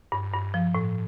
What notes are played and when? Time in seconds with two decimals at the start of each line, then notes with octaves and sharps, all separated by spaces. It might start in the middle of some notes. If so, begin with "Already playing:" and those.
0.12 G2
0.33 G2
0.54 F3
0.75 A2